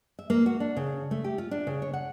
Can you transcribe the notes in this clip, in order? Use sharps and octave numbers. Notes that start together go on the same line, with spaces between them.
E5
A#3
F#4
D4
C#3
A3
G4
F4
D4
C#3
C#5
F#5